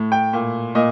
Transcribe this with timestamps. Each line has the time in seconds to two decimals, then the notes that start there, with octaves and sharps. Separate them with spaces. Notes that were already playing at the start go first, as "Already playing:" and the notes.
Already playing: A2
0.12 G5
0.33 A#2
0.75 A#2 D#5